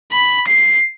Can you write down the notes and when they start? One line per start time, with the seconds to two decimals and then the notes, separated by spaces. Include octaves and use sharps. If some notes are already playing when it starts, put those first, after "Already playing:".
0.12 B5
0.48 C7